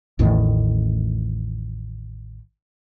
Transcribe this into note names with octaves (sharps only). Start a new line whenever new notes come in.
A1 E2 A2 D#3